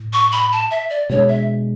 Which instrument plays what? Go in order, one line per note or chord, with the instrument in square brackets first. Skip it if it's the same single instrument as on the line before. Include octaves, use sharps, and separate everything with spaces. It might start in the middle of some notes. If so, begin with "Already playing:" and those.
Already playing: [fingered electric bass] A2
[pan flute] C#6
B5
A5
E5
D5
[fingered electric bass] B2 G#3 D4 [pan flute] C#5
[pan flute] E5